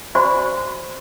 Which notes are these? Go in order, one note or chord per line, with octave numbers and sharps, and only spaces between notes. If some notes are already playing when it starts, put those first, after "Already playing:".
F#4 C5 D5 G#5 B5 C#6